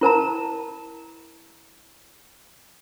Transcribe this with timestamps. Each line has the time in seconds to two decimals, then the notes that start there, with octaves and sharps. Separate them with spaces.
0.01 E4 A#4 A5 A#5